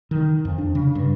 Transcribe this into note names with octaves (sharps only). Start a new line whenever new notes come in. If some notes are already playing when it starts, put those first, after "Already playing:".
D#3
F2
D4
C#3
G2